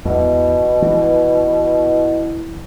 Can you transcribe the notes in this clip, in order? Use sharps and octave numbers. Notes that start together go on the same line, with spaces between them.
E2 B2
E3